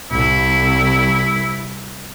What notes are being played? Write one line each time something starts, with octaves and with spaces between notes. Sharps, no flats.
C2 E4